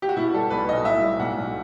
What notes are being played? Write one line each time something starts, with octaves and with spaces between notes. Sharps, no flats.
G4
F#4
B2 E4
G3 A4
B1 B4
B1 D#5
A2 E5
G3
B1 F#5
B1